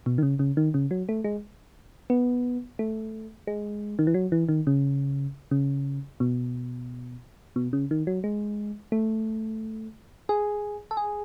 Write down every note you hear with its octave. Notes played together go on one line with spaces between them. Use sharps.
B2
D#3
C#3
C#3
D#3
C#3
F#3
A3
G#3
B3
A3
G#3
D#3
E3
F#3
E3
D#3
C#3
C#3
B2
B2
C#3
D#3
F#3
G#3
A3
G#4
A4
G#4